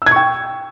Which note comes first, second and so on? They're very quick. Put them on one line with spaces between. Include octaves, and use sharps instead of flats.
E6 G#6 C#6 G5